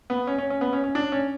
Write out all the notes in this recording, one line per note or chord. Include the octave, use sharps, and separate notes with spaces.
B3
C#4
C#4
C#4
B3
C#4
C#4
D4
C#4